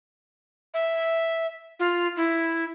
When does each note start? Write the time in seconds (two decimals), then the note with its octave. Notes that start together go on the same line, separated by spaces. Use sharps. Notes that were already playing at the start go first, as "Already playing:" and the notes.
0.74 E5
1.79 F4
2.17 E4